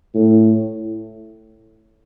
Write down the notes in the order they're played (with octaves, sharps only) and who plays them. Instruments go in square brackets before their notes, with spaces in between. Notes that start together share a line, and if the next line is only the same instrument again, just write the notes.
[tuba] A2